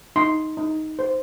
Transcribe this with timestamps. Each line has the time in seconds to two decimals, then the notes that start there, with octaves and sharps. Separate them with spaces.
0.16 D#4 C6
0.57 D#4
0.99 C5